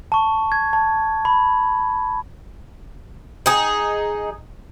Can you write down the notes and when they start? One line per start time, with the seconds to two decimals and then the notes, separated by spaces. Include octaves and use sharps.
0.12 A5 C#6
0.52 G#6
0.73 A5
1.25 B5
3.46 D#4 G#4